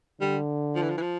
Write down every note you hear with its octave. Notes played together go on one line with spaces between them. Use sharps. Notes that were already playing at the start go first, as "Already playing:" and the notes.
D3 G3
F3
E3
F3
E3
F3